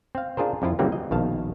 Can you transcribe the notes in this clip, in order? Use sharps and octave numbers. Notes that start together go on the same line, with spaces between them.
C4 F5
D4 F4 G#4 A#4 C5
F2 F3 E4 F4
C#3 E3 F#3 G3 A#3 C4
D#5
A#1 B2 D#3 F5 A5